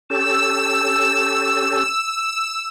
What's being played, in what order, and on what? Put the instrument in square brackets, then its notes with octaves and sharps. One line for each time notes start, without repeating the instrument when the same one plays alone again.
[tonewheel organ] C#4 G4 A4 [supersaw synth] E6 [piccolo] E7